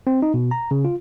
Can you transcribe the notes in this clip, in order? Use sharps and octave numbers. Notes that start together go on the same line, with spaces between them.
C4
D#4
B2
A#5
C#3
F4